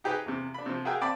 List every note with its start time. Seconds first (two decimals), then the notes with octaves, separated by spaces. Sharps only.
0.04 D#4 G4 G#4 B4 D#5
0.26 E2 C3
0.54 D4 B5
0.66 C3 F3
0.85 F#4 G#4 A#4 E5 F5 G5
1.01 C4 D5 G5 A5 B5